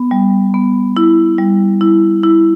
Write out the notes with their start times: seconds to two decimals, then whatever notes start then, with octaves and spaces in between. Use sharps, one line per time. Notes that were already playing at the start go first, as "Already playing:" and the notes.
Already playing: B3
0.11 G3
0.54 B3
0.97 E4
1.38 G3
1.81 E4
2.23 E4